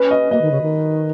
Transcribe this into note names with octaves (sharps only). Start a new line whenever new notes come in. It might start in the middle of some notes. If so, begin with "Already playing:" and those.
Already playing: C#4 B4
D#5
A#3 D#5
D#3
C#3
D#3